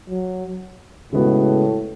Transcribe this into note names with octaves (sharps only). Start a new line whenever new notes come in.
F#3
A2 C#3 G#3 B3 F#4